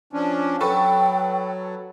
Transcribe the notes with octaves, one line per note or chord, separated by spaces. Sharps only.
F3 C#4 D4
F#3 A4 B4 G5 C#6